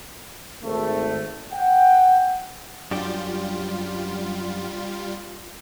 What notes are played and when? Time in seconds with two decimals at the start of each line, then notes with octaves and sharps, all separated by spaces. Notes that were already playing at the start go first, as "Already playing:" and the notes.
0.63 G#1 A3
1.52 F#5 G5
2.91 F#2 G3 D4 F4 G4